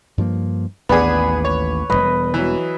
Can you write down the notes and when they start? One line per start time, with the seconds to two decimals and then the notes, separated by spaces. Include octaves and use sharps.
0.18 G2 F3 A#3
0.89 A1 D#2 B3 D4 G#4 B4 D6
1.45 C#5
1.90 E1 D#2 G3 B4 D#5
2.34 E3 F#3